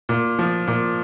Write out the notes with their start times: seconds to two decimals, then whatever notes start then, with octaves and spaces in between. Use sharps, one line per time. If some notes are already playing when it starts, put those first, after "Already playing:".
0.09 A#2
0.39 F3
0.67 A#2